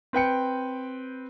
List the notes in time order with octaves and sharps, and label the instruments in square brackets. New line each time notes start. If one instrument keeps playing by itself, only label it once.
[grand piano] C4 B4 G5 C#7